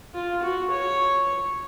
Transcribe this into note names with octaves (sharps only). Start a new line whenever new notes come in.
F4
F#4
C#5